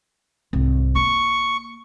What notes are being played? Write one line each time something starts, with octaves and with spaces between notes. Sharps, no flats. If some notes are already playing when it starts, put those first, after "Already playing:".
C2 G#2
A#3 C#6